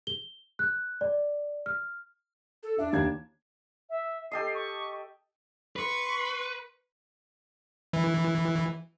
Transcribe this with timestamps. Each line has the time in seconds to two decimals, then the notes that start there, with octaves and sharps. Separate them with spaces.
0.07 G7
0.59 F#6
1.01 D5
1.66 F6
2.63 A4
2.78 D4 E5
2.92 D#2 D4 G#6
3.90 E5
4.31 G4 A4 D#5 C7
4.55 C#6
5.76 B4 C6 C#6
7.93 E3